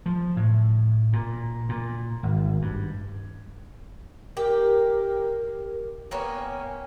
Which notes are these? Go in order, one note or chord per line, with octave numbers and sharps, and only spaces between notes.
F3
A2
A#2
A#2
G#1
G2
G4 A#4
A#3 B3 C#4 G5